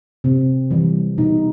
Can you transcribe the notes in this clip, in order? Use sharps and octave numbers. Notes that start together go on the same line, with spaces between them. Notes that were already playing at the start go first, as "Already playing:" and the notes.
C3 C4
E3 G3
B2 D#4